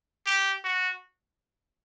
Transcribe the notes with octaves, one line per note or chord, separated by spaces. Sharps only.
G4
F#4